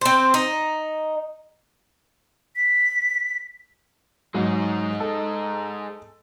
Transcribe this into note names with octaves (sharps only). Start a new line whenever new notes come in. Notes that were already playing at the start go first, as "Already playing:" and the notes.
C4 C5
D#4
B6
G#2 F#3 G#3 D#4
A4